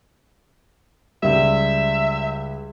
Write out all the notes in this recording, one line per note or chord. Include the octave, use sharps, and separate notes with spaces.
C#2 G3 E5